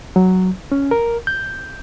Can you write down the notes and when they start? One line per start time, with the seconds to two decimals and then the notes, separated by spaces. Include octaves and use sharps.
0.16 F#3
0.72 C#4
0.91 A#4
1.27 G6